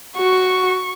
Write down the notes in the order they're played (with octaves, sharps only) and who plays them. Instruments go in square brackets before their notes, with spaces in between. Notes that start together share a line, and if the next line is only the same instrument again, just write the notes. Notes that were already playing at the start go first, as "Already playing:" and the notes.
[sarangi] F#4 [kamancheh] C#6